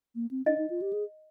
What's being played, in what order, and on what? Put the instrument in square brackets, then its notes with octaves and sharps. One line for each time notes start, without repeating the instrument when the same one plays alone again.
[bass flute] A#3
C4
[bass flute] D4 [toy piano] D#5
[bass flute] D#4
F4
G4
G#4